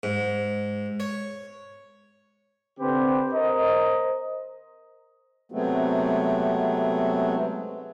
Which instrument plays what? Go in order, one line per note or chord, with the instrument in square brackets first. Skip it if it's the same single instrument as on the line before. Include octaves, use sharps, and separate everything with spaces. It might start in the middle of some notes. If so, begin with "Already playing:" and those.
[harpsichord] G#2
C#5
[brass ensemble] D3 C4 G4 B4 C5
A#4 C5 D#5
[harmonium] C3 F#3 G#3 A3 B3 C4